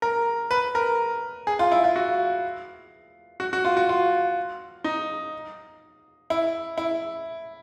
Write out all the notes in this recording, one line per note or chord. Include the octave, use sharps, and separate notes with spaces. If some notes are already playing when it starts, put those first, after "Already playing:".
A#4
B4
A#4
G#4
F4
E4
F4
F#4
F#4
F#4
F4
F#4
F4
D#4
E4
E4